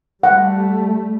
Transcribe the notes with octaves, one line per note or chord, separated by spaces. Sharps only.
G3 A3 F#5